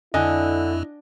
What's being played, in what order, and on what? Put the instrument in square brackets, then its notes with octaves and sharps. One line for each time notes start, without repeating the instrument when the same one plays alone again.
[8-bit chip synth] F2 [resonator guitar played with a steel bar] D3 [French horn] E4 [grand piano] D#5 G#5